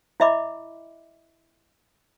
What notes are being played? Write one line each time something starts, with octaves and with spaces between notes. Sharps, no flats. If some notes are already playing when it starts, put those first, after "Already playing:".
E4 D#5 E5 B5 D6